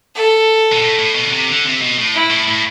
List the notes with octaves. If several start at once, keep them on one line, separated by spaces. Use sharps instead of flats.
A4
B2
A2
A2
B2
D3
C3
D3
C3
B2
A2
E4
A2
A2